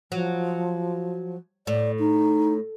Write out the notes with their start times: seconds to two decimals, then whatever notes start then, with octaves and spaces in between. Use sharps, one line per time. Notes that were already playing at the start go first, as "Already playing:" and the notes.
0.12 F3 F#3
1.67 A2 D5
1.99 D#4